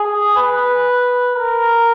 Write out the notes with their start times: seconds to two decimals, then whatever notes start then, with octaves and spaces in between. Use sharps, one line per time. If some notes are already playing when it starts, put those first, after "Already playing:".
Already playing: G#4
0.37 B4
1.35 A#4